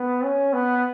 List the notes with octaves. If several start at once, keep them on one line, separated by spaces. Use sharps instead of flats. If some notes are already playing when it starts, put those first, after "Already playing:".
Already playing: B3
C#4
B3